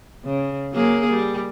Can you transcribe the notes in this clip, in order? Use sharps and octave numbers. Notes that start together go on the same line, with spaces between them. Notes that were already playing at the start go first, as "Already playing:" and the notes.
C#3
F#3 A#3 G#4
G3